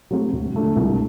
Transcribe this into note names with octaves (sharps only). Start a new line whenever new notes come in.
F#3 A3 C4 F#4
D2
D3 A3 D4
C2